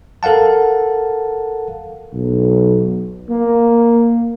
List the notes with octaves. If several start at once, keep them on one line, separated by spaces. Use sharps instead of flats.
A4 A#4 F5 F#5 A5
B1
A#3